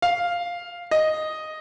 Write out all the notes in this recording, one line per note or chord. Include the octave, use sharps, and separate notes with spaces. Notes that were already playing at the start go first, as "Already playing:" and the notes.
F5
D#5